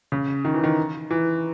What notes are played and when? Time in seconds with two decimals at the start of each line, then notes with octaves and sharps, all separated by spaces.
0.12 C#3
0.45 D#3
0.54 E3
0.64 D#3
1.11 E3